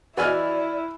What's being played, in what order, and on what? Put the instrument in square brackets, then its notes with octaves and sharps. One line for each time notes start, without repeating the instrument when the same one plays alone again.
[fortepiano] E3 G#5 F6 [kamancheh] E4 [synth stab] F#4 D#5 [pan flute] D5